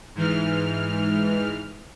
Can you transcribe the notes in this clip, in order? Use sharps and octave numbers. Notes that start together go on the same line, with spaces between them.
G#2 E3 F6